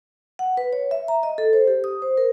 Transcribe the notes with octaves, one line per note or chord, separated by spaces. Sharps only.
F#5
B4
C#5
E5
A#5
D#5
A4
C5
G4
D#6
C5
A#4